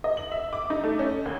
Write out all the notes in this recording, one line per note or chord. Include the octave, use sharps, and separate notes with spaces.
D#5
F#7
E5
D6
D#4
A3
C#4
D#2